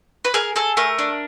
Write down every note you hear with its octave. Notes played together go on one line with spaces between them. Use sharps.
B4
G#4 A#4
G#4 A4
A3 A#4
D4